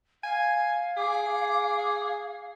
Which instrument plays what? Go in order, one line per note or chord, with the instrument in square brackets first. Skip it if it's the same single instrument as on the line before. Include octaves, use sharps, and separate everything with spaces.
[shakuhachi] F5 [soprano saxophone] G#5
[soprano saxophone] G#4 [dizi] D6